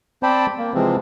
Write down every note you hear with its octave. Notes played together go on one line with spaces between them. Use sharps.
C4 C5 D5 G5 A5 B5
A#3
C3 E3 F3 G#3 C4